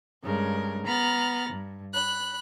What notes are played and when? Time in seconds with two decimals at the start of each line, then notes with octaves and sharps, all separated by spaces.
0.22 G2 C#3 G#3 A#4
0.85 B3 A#5 B5 F6 A6
1.50 G2
1.92 B5 F#6